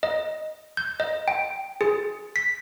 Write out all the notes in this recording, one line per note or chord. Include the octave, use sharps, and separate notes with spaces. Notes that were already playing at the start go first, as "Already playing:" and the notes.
D#5
G6
D#5
G5
G#4
B6